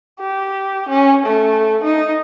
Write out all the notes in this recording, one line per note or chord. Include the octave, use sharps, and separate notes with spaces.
G4
C#4
A3
D#4